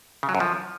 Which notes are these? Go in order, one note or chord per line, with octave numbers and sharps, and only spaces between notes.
C#3
F#3
F#2
F3